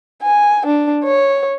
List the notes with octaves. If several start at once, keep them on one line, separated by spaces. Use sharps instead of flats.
G#5
D4
C#5